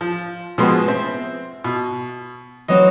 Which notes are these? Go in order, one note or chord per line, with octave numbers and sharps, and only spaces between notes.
F3
B2 F3 G#3 B3 C4 C6
C4 E5
B2
E3 F#3 C4 D#5